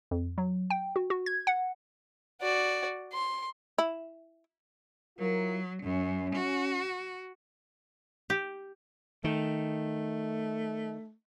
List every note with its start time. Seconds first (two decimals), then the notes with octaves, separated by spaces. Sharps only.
0.11 F2
0.38 F#3
0.70 G5
0.96 F#4
1.10 F#4
1.26 G#6
1.47 F#5
2.41 F#4 D5
3.13 C6
3.78 E4
5.18 F#3 E4 F4 A#4
5.83 F#2 C#4
6.35 F#4
8.30 G4
9.24 D#3 A3